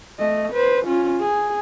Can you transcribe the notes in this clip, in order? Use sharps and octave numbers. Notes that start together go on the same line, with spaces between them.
A3 D#5
B4 C5
C#4 F4
G#4